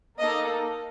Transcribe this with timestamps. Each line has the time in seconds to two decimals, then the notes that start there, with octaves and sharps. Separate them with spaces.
0.19 A#3 D#4 A4 D#5